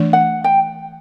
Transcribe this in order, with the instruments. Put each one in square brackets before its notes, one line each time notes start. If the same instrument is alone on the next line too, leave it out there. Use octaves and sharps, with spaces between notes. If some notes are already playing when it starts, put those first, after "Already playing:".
Already playing: [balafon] E3 A3 D4
[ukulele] F#5
G5